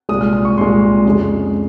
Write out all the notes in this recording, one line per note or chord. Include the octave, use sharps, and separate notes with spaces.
C2 A#2 G#3 D#6
F6
D#6
C#6
C2 A#2 G#3 C6
F2 C#3 G#3